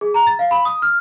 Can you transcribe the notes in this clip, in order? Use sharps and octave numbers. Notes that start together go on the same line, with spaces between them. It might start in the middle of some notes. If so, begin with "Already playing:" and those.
G#4
A#5
A6
F5
B5
D#6
F6